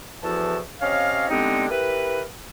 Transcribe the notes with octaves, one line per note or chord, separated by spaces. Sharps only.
E2 E3 F3 F#4 A4 A5
C3 C#4 C#5 D#5 F5
D3 G3 G#3 B3 C4 D#4
E4 G4 A#4 B4